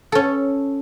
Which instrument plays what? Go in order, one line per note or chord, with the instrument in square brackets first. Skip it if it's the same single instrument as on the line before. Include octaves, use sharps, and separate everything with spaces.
[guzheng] C#4 A4